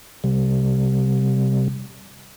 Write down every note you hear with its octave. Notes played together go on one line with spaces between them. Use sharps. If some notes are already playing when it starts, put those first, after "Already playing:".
C3 G3